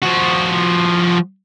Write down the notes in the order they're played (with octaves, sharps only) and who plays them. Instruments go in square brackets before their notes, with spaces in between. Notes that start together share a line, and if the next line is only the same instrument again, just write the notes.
[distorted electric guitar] F3 F#4